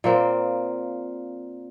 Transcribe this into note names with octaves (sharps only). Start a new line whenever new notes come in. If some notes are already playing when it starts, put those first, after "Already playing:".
A#2 A#3 C4